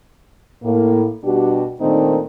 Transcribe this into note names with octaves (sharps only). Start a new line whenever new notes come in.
A2 A#3
B2 G3 D4 F#4 G4
A#2 D#3 A3 C4 D4 D#4